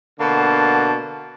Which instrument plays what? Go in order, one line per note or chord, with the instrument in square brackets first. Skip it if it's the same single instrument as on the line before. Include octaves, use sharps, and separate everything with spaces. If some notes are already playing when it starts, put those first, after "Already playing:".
[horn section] B2 D3 A#3 A5